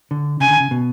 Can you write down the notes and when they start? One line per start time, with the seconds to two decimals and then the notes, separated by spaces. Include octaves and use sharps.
0.11 D3
0.40 C#3 G#5
0.50 D3
0.60 C#3
0.71 B2